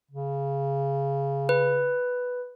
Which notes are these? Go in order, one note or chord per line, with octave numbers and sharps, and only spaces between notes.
C#3
B4